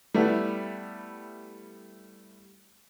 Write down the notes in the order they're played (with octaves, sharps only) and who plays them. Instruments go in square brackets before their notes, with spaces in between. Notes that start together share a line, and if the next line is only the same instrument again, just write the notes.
[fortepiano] G3 A3 B3 E4